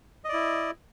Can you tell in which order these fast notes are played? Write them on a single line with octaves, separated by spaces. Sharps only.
D#5 D5 E4